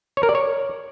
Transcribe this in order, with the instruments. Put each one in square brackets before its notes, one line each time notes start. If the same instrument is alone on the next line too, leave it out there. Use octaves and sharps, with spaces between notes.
[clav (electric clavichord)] C#5
A#4
D5
C#5